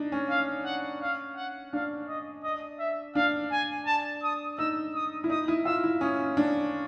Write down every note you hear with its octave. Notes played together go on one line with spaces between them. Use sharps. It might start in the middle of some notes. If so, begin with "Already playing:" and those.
Already playing: D4 D#4
C#4
F5
F#5
F5
F#5
D4 F5
D#5
D#5
E5
D4 F5
G#5
A5
D#6
D#4 E6
D#6
E4
D#4 D#6
E4
F4 E6
E4
C#4 D#6
D4